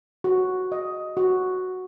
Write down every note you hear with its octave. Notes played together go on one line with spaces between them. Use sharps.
F#4
D#5
F#4